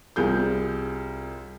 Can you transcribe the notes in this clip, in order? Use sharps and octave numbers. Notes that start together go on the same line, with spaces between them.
C2 F4 G#4 G6